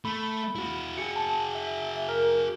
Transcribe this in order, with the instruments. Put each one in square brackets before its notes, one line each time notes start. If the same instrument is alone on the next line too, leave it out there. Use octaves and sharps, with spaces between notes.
[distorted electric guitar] A3 [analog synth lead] B5
[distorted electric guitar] E4 F#4
[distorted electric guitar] F#4 G#4 [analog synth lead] C#7
[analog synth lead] A5
E5
A#4